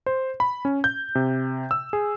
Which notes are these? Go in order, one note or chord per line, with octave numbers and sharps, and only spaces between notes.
C5
B5
C#4
G6
C3
E6
G#4